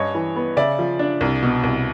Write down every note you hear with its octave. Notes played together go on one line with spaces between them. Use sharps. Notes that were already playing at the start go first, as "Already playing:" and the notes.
Already playing: G2 C#4 C#5 D#5
E3
B3
C#3 D5 E5
F3
D4
C2
B2
C2